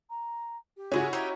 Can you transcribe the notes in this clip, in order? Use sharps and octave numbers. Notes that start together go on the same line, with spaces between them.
A#5
G4
C#3 G#3 C#4 E4 F#4
D#4 G4 C#5 A#5